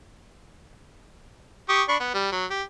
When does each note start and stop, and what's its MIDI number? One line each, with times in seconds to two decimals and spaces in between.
1.69 1.83 67
1.69 1.83 85
1.69 1.83 87
1.88 1.96 62
1.88 1.96 83
1.88 1.96 85
2.00 2.11 59
2.14 2.32 55
2.32 2.45 54
2.51 2.62 67